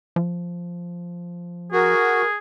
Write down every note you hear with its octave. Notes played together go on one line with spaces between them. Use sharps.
F3
F#4 G#4 A#4